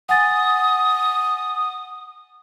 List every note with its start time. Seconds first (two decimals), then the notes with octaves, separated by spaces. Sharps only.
0.09 F#5 G#5 D#6 A6